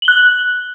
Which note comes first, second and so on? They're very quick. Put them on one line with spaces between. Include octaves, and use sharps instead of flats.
F#7 G7 F#6